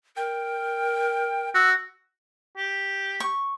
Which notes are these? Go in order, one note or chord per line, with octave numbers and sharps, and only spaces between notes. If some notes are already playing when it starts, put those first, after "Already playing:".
A#4 G5
F#4 E6
G4
C#6